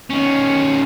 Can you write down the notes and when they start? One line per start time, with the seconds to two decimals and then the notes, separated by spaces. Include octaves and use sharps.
0.10 D#3 C#4